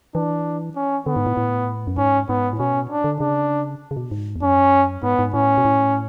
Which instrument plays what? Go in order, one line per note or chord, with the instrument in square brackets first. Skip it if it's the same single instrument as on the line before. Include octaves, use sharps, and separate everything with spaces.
[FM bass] E3 [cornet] D4
[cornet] C#4
[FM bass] D3 [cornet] B3
[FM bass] G#2
A2
A2
F#2
[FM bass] G#2 [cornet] C#4
[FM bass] G#2 [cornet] B3
[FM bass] A2
[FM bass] B2 [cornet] C#4
[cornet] D4
[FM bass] D3
[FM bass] C#3 [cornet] D4
[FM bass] C#3
B2
G#2
E2
[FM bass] F#2 [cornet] C#4
[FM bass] G#2 [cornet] B3
[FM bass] G#2
[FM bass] A2 [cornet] C#4
[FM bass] B2
A2